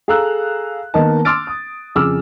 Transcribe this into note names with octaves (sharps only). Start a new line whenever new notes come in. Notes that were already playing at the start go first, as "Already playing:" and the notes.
G#4 A4 F5 A#5 E6 F#6
D#3 A#3 B3 A#4 D#5 A5
C6 D6 E6 F6 A6 D7
D#6
F2 C#3 G#4 D6 E6 F6